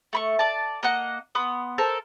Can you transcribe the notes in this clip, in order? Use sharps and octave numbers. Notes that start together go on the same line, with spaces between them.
A3 B5 C#6
D5 A5
A#3 D#5 F#5 F#6
B3 C6 D#6
A4 A#4 C5 A5